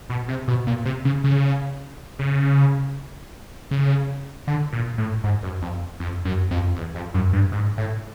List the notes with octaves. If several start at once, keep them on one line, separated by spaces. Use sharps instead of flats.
B2
C3
B2
A#2
C3
C#3
C#3
C#3
C#3
D3
A#2
A2
G#2
F#2
F2
F2
F#2
F2
E2
F2
F#2
G2
G#2
A2